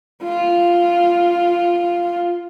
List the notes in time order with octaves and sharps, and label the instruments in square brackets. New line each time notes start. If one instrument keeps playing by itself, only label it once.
[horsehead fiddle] F4